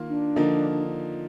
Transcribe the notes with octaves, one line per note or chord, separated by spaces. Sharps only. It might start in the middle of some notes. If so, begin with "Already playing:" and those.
Already playing: D#3 A#3 F4
D4
D3 F3 A#3 D#4